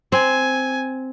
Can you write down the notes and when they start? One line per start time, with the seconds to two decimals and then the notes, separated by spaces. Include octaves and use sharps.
0.12 C4 G#5